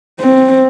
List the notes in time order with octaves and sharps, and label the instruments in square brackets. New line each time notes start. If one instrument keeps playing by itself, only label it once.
[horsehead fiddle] C4